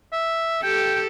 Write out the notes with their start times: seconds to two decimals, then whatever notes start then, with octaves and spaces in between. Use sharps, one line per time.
0.13 E5
0.63 G4 A4 G5